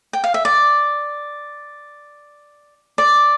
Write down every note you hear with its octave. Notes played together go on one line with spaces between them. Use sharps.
G5
F5
E5
D5
D5